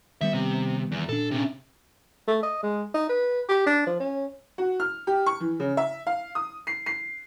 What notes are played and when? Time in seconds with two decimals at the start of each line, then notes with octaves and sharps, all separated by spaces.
0.21 D#3 G3 B3 E5
0.34 C3
0.92 E2
1.09 A#2 D4 A4
1.31 C3 C#4
2.28 A3
2.43 D#5
2.63 G#3
2.94 D#4
3.09 B4
3.49 G4
3.66 D4
3.87 F3
4.00 C#4
4.58 F#4
4.80 F6
5.07 G4
5.26 C#6
5.40 E3
5.60 C#3
5.77 E5
6.07 F5
6.35 D#6
6.67 C7
6.86 C7